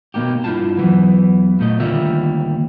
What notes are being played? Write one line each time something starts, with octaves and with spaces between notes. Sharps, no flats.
B2 A#3 D#4 G4
G2 E4 F4 A5
E2 E3 F#3 B3
A#2 A3 D#5
D2 D#3 G3 A#3 F4 E5